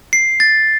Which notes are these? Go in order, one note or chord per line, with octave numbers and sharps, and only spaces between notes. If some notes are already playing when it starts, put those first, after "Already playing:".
C7
A6